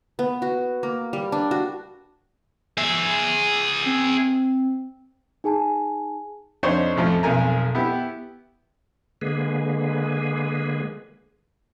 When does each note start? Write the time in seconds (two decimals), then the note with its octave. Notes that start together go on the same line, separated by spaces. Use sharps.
0.19 B3
0.42 F#4
0.83 A#3
1.13 G3
1.32 D4
1.51 F#4
2.78 G#4 E5
3.86 C4
5.44 D#4 G#4 G#5 A5
6.63 F2 D4 D#4 C5 C#5
6.96 A1 F2 F3 A3
7.23 B1 F2 A#4 G#5 A#5
7.75 B3 E4 G4
9.21 D3 G#3 A#3 G#4 B4